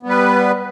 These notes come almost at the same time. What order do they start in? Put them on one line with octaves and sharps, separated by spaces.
B3 G3 B4